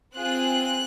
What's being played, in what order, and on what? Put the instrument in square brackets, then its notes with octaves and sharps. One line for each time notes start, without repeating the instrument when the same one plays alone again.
[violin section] C4 F4 G#4 F#6